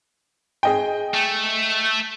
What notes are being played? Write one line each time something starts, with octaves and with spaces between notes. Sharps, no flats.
G#4 D#5 G5
A3